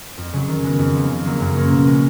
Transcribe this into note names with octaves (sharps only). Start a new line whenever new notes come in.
F2
C#3 F#3
D#3
G#3 B3
F2
F3 B3
C#3
F#3 A#3
F#2
F3 A#3 C#4
B2
G#3 C#4